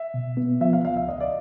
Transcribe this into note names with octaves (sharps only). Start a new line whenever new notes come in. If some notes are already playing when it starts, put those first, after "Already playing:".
Already playing: E5
B2
B3
F3 E5
F5
C#2 F5
E5
D2 D#5
D5